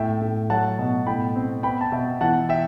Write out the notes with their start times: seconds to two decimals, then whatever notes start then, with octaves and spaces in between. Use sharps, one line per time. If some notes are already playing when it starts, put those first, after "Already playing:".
Already playing: A2 E5 G5
0.21 A2
0.50 F#3 F#5 A5
0.79 B2
1.07 A2 G5 B5
1.36 C4
1.63 B3 G5 B5
1.81 A5
1.92 B2 E5 G5
2.21 E3 F#5 A5
2.49 E5 G5